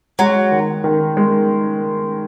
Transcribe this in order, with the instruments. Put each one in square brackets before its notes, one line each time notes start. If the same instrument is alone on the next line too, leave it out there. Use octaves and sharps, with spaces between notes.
[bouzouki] F#3 [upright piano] G#3
[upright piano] D#3
D#3
G#3